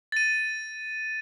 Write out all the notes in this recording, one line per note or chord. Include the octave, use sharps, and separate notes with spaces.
A6 D#7